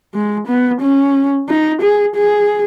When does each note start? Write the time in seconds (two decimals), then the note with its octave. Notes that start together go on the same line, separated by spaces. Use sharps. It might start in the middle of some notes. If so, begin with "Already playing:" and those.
0.14 G#3
0.48 B3
0.81 C#4
1.49 D#4
1.82 G#4
2.16 G#4